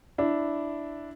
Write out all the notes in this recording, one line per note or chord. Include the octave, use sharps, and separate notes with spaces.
D4 E4